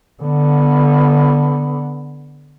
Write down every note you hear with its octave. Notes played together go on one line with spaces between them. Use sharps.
D3 B3